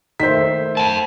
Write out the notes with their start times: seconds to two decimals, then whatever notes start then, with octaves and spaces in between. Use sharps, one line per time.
0.20 D#3 A3 A#3 C5 B6
0.77 A#4 G5 A5